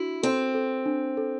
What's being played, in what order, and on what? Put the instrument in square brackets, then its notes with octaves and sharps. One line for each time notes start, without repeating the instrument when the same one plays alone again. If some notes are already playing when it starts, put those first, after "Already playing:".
Already playing: [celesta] D4 F#4 [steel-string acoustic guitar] E4
[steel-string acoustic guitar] C4 [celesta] A4
[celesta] A4
D4
A4